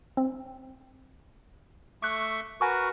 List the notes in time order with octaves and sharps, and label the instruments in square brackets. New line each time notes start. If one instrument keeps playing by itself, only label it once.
[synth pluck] C4
[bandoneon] A3 E5 C#6 [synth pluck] D6 F#6
[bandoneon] F#4 A#4 B4 [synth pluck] G#5 C#6